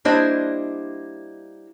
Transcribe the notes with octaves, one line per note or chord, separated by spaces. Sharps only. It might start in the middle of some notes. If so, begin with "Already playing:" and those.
G3 A#3 D4 E4 C5 D#5